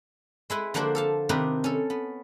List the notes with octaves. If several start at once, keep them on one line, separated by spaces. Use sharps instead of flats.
G#3 E4 B4
D3 F3 A#3 D4 F#4 C5
A4 F5 A5
C3 D#3 D4 D#4 A#4 B4
C#4 A4
B3